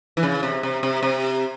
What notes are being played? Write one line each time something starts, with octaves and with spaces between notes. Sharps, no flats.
E3
C#3
C3
C3
C3
C3